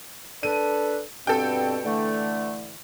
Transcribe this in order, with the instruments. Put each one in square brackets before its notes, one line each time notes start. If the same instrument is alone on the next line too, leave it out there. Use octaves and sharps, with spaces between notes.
[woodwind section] D4 A4 B4 [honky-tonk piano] D#7
[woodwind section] G2 B2 C4 [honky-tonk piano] A4 G5
[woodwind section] D3 E3 A3